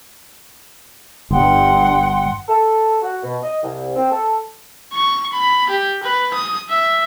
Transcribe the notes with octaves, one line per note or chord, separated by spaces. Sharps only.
G1 G2 F#5 G5 C6
A4
F#4
B2
D#5
C2
C4
A4
C#6
B5
G4
B4
D#6
E5